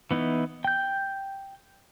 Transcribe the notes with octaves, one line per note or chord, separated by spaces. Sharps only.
E3 B3 D#4 E4
G5 G6